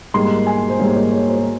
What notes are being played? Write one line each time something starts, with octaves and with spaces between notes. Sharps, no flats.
G#2 G3 A#3 C6
G#5
C5
G#2 G3 A#3 C#5
C#5
C#5
C5
C5